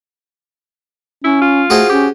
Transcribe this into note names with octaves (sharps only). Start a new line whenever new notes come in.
C#4 E4
F4
A3 F#4 G#4 C5
C#4 G4